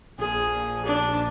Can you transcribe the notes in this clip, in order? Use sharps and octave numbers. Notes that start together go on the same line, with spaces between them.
A#1 A#2 F3 G#4
D4